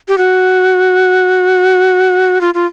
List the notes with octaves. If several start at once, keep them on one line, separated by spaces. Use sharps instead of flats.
G4
F#4
F4
F4